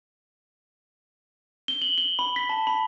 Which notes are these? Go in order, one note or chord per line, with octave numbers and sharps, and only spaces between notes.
G7
F#7
G7
B5
B6
A5
B5